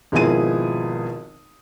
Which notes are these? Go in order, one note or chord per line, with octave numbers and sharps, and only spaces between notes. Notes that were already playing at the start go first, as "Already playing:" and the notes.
G#1 B2 F3 E4 G#4 D#7